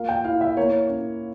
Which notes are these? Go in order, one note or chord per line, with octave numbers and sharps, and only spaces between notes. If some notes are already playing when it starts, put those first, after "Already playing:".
Already playing: A#3 F4 F5
G5
E4 F5
E5
A#3 C#5
C#4